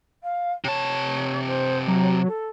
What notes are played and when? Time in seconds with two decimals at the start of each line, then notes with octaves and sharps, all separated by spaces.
0.23 F5
0.64 C3 C#5 A5
1.47 C5
1.88 F#3 A#5
2.27 A4